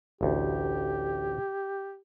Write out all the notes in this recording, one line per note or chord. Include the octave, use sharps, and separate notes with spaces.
A1 D2 G4